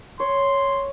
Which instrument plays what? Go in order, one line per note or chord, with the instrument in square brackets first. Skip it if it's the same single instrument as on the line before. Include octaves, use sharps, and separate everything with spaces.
[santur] C#5 [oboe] C6